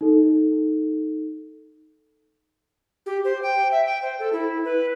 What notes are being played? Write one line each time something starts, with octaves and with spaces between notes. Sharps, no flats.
D#4 A4
G4
C5
G5
E5
G5
C5
A4
E4
B4